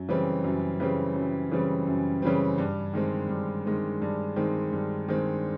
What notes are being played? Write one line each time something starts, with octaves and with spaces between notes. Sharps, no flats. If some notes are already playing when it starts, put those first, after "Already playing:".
Already playing: F#2
C#3 E3 G3 C4
F#2
C#3 E3 G3 C4
F#2
C#3 E3 G3 C4
F#2
C#3 E3 G3 C4
G2
D#3 G#3 C4
G2
D#3 G#3 C4
G2
D#3 G#3 C4
G2
D#3 G#3 C4